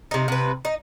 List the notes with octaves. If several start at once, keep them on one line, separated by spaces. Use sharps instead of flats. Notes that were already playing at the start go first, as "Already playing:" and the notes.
C3 D#4
C3 B4
D#4